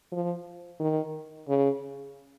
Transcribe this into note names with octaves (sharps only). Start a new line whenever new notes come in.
F3
D#3
C#3